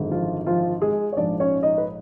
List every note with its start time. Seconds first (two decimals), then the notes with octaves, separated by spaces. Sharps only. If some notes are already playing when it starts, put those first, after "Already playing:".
Already playing: G#1 F#2 D3 G#3
0.11 F3 F4
0.46 F3 F4
0.82 G#3 G#4
1.13 C#5
1.16 A#1 G#2 F3 D4 D5
1.40 C#4 C#5
1.63 D#4 D#5
1.78 B4